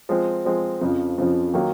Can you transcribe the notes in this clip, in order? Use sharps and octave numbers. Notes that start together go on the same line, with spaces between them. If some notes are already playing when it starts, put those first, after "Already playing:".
F3 G#3 C4
F3 G#3 C4
F2 C#3 F3
F2 C#3 F3
D#3 F#3 A#3